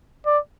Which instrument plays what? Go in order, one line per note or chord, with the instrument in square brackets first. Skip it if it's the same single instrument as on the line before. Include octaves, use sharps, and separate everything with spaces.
[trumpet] D5